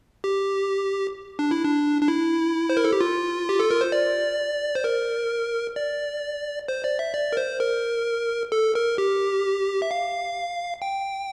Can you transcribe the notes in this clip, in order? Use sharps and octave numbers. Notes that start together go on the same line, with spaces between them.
G4
D4
E4
D4
D4
E4
C5
A#4
A4
G4
F4
G4
A4
A#4
C5
D5
C5
A#4
D5
C5
D5
E5
D5
A#4
C5
A#4
A4
A#4
G4
E5
F5
G5